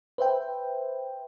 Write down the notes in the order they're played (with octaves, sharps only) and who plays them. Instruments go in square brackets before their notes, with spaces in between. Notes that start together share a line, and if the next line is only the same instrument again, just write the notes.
[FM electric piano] B4 C5 E5 G5